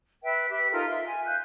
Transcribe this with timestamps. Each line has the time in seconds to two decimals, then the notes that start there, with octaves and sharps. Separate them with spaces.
0.23 B4 E5 G5
0.50 G4 B4 E5
0.71 D#4 F4 A4 A#4
0.86 E5 C6
1.06 G#5
1.25 F5 F#6 G6